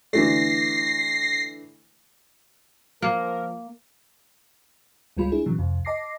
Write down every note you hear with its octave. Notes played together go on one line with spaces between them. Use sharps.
D3 E3 A3 A#6 C7
F3 A#3 A#4
G#1 C#2 G3 G#3 F4 B5
D4 E4 G#4
A#2 C#3 E3 F#3
C2 F2 C3
D#5 A5 D6 A#6 C7